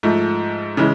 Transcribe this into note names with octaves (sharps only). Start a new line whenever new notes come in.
G#2 F3 A3
C#3 E3 G#3